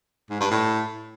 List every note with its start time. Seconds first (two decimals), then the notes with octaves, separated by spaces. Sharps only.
0.30 G#2
0.40 G2
0.51 A2